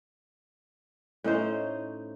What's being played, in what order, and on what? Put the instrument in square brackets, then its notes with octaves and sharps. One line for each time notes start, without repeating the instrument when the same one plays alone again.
[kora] A2 C#4 D#4 C5